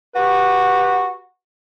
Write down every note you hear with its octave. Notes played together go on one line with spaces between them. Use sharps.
F#4 G4 B4